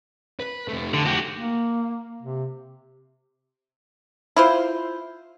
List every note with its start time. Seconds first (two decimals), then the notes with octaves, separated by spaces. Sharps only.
0.40 B4
0.68 F2 A3
0.94 D3
1.06 F#4 G4
1.35 A#3
2.23 C3
4.36 E4 F4 C5